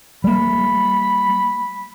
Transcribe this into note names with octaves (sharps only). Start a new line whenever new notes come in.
G3 A#3 B5